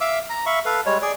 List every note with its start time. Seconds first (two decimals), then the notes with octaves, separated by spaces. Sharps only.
0.01 E5 F5 D6 E6
0.30 A#5
0.46 E5 F5 B5 C#6
0.65 A4 B4 F5
0.86 G3 G#3 C#5
1.02 G#4 D5